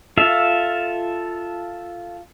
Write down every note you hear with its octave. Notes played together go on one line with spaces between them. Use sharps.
F4 A4 E5 F5